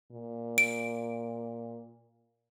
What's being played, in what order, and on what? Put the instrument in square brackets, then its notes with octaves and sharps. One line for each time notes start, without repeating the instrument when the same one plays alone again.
[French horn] A#2
[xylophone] D7